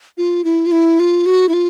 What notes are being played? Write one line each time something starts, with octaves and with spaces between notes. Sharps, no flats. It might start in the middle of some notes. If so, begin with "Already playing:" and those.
F4
E4
F4
E4
F4
F#4
E4
F4